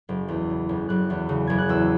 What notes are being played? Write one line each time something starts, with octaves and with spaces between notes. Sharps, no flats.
F#1
E2
C#3
F#1
F#1 F#6
E2
C#3
F#1 G#6
F#6
E2 E6